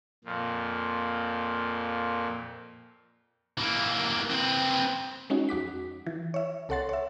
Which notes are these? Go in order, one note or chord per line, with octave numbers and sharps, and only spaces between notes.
F2 A#2
E3 A#3
C4 B4
G#3 C#4 D#4 F#4
F2 F#4 D6 B6
E3
C#5 E5
C2 A4 C#5 F#5 C6 A6
C#5 E5